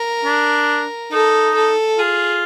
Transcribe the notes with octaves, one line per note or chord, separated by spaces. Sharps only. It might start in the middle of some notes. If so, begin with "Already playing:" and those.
Already playing: A#4
D4
D#4 A4
A4
F4 G#4